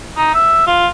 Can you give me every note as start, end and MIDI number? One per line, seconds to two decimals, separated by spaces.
0.17 0.33 63
0.34 0.64 76
0.67 0.87 65